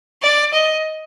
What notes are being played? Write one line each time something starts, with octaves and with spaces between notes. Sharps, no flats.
D5
D#5